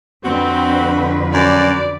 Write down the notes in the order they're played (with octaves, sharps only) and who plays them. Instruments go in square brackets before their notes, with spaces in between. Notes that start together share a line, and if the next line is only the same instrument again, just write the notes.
[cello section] F2 D3 B4 [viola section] C4 [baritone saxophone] F#4
[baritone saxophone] F#2 [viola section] D5